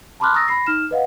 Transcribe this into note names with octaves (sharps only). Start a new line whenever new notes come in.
A5 B5 C6 D6 F6 F#6
A#5 C#6 D#6 E6 A6 A#6
B5 A#6 C7
D#4 F6 E7
B4 D#5 F5 F#5